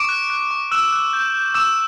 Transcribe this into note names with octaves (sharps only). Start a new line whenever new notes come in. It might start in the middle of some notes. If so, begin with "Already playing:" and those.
Already playing: C#6 D6 D7
F#6
F#6
C#6
E6 F#6 E7
F#6
G6
G6
D6 E6 E7